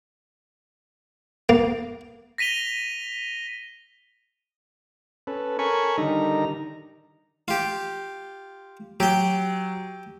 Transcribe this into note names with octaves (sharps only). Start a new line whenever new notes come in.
A#3
A#6 B6 D#7 F7 G7
C#4 A4 B4
A4 A#4 C#5 G#5 B5 C#6
D3 D#3 G3 D#4 A#5
F4 G4
F#3 G4 G5